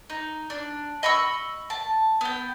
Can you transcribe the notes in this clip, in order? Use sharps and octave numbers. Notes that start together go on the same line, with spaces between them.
D#4
D4
D#5 B5 C#6 E6
A5
B3 G5